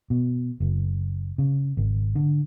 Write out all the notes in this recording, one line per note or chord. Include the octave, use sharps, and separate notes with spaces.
B2
F#1
C#3
G#1
D3